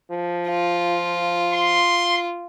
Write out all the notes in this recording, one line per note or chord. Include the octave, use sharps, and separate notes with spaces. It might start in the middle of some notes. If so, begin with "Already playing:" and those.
F3
F4
C6